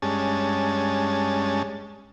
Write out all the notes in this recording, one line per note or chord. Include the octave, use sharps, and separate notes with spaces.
G2 G#3 C#4 A5